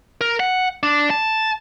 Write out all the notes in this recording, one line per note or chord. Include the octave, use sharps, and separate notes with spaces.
A#4
F#5
D4
A5